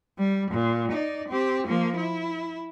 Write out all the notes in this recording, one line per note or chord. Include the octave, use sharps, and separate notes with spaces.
G3
A#2
D#4 D5
C4 G4
F3 A#3
E4